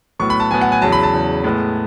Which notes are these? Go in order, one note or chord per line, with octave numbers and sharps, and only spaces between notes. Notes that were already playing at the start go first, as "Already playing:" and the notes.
A2 F#3 B3 C#6
B5
A5
A2 F#3 B3 G#5
F#5
G#5
E2 C#3 F#3 A5
B5
A5
E2 C#3 F#3
A2 G#3 B3